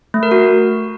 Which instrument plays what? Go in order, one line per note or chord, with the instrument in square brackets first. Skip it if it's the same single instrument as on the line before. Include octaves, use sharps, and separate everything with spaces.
[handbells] A3
A#4
F#4